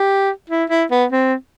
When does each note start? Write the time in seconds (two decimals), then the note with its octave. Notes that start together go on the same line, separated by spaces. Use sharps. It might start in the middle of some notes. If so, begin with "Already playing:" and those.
Already playing: G4
0.49 E4
0.70 E4
0.91 B3
1.12 C4